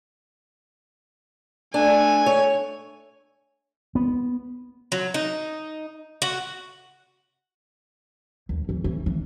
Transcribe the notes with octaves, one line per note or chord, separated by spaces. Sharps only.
A3 D4 G#5
C#5
B3
F#3
D#4
F#4
D#2
F2
E3
E3